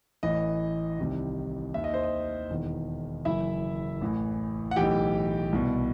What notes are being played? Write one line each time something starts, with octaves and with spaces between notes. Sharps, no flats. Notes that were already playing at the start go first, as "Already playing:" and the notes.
A1 A2 E3 D#5
C2 C3 D#3
D#2 D#3 E5
D#5
C5
D#5
E1 E2 D#3
F#1 F#2 E3 E4 E5
A1 A2 E3
F#5
B1 A2 E3 G4 G5
C2 B2